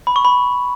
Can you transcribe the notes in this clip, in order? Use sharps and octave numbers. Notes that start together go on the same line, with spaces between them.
B5
C#6
B5